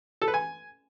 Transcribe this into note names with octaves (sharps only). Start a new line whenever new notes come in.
A4
B4
G#5